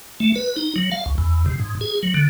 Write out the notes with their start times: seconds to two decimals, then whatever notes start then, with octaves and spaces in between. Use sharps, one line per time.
0.20 A3
0.36 B4
0.56 D#4
0.76 F#3
0.92 F5
1.06 C#2
1.18 E2
1.46 C3
1.60 G#2
1.81 G#4
2.03 F#3
2.14 D3